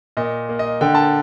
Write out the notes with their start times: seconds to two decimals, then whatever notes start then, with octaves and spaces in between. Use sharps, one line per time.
0.17 A#2 D#5
0.49 A#3
0.59 D#5
0.81 D3 G5
0.95 A5